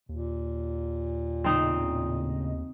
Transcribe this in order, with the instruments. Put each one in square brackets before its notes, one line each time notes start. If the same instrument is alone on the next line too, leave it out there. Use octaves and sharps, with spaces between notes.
[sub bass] D#2 [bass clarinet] A#2
[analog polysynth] A2 C#3 D#5 [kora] C4 D#4